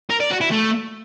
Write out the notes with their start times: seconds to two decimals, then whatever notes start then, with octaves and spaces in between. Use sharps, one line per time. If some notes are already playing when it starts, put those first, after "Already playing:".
0.10 A#4
0.20 D5
0.31 F#4
0.41 E4
0.51 A3